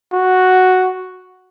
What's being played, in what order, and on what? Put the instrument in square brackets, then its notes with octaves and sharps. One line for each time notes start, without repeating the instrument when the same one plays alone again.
[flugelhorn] F#4